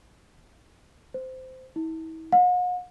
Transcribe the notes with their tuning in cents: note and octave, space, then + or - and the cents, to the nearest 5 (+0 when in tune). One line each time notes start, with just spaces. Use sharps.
C5 -15
E4 -40
F#5 -45